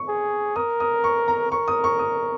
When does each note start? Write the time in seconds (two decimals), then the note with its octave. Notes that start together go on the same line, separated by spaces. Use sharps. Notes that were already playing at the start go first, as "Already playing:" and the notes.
Already playing: C#6
0.08 G#4
0.56 A#4 D#6
0.80 D#6
1.04 C#6
1.28 A#5
1.52 A#4 C#6
1.68 D#6
1.84 C#6
1.99 D#6